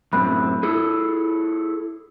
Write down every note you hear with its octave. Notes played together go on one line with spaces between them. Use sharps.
F#2 A2 C4 B5 F#6
E4 G#4 A4